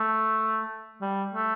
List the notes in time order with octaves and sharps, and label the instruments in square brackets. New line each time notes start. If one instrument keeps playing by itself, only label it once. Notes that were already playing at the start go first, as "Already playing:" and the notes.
Already playing: [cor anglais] A3
G3
A3